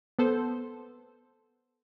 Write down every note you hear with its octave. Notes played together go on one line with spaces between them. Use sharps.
B3 A4 C5